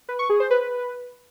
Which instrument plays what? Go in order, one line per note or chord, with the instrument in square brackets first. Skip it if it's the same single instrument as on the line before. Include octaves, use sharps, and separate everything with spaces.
[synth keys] B4
C#6
G#4
C5
B4